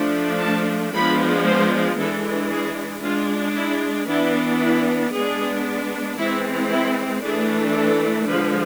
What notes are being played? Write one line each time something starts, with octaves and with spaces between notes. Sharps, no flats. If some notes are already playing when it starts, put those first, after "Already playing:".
Already playing: F3 A3 D4
A5
F3 G#3 B3 D4 B5
C5
E3 G#3 D4 A4
G#4
G#3 D4 F4
E4
E3 B3 D4 E4
E4
G#3 B3 D4 G#4
E3 G#3 C4 E4
E4
E3 A3 D4 G#4
A4
D3 F3 G#3 B4